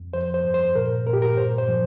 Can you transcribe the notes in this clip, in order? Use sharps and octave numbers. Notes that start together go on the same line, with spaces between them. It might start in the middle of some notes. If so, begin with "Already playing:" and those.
Already playing: F2
F3 C5
C5
G2
C5
A#2 A#4
A#2 A#4
G4
A#4
G2 C5
C5
F3